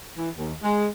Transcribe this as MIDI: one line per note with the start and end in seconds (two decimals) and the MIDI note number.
0.17 0.29 52
0.37 0.54 39
0.63 0.87 56